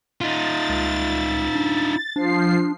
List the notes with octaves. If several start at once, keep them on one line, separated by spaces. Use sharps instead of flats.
D#4 F4 A6
C#2
D4
F3 D4 C7